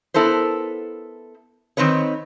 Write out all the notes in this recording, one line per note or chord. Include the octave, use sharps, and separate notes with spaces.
B3 E4 A4 A#4 C5
D#3 C4 D#4 B4 C#5